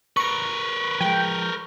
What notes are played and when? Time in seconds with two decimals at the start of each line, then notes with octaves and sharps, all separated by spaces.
0.17 A#4 B4 C#6
1.00 F3 G#3 G5